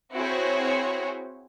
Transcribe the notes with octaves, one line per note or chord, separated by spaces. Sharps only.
C4 E4 F#4 G#4 C5 C#5